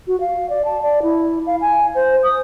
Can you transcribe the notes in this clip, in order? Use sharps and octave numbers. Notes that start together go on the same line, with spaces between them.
F#4
F5
D5
A5
D5
E4
F5
G#5
C5
D#6